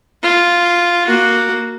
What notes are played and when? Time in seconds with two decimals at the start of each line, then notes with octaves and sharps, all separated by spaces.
0.23 F4
1.07 A#3 F#4